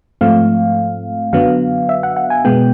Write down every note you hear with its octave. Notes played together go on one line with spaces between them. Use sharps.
G#2 F3 A3 C4 F5
F#2 D3 F#3 B3 F5
E5
F#5
F#5
G#5
B2 G#3 B3 G5